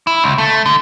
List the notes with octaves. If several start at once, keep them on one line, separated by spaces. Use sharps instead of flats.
E4
C#2
A3
D3